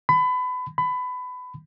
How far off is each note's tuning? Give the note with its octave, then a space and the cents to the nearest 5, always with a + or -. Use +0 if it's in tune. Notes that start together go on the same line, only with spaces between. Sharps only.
B5 +25
B5 +20